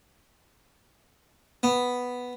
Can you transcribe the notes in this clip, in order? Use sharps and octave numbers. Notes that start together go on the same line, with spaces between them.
B3